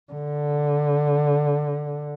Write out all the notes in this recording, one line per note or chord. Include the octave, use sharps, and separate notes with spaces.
D3